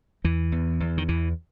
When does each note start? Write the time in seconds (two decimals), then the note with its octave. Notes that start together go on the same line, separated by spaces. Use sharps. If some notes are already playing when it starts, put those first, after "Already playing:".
0.24 E2 E3
0.52 E2
0.80 E2
0.98 D#3
1.08 E2 E3